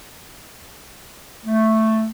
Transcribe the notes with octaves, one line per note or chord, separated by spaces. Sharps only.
A3